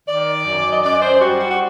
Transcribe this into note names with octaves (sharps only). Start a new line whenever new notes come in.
D#3 D5
F#2
D#5
F#2 D5
C5
G3 F#4
F#4
F#4